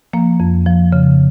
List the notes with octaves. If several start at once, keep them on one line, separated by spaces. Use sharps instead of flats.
F3 A#3
F2
F3
C#3